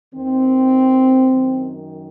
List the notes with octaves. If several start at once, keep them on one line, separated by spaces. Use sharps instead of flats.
D#2 D#3 C4
F#2 D#3